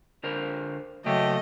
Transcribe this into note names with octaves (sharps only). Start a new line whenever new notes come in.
D3 A#4 C5
C#3 F#3 A3 A#3 D#5 G5